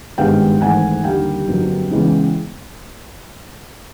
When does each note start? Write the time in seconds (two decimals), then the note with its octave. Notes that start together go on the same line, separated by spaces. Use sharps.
0.18 G#1 G2 D#3 G#3 B3 F5 G5
0.61 G#1 G#2 E3 A3 F#5 G#5
1.04 D#2 D3 G3 A#3 F5 G5
1.47 G1 F2 D3 F#3 A#3
1.91 C#2 C#3 E3 G#3 B3